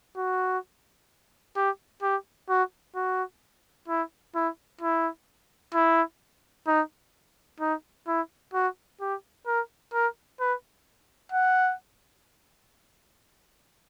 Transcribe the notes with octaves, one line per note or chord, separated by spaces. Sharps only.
F#4
G4
G4
F#4
F#4
E4
E4
E4
E4
D#4
D#4
E4
F#4
G4
A#4
A#4
B4
F#5